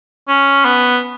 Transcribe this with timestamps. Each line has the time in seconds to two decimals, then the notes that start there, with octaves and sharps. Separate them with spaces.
0.28 C#4
0.65 B3